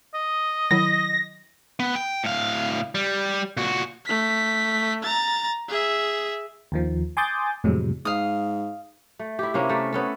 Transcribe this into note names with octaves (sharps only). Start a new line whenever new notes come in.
D#5
D#3 F#3 E4 A#6
B3
G5
A2 F5
G3
A#2 F#4
A3 B6
A#5 A6
G#4 E5
D#2 D#3 F3
G#5 C6 D6 D#6 G6 A6
F2 A2 C3 F#3 G#3
G#2 F5 D#6
A3
E4 G4
C3 A#3 C#4 E4
A3 G4 A4 A#4
B3 C#4 A4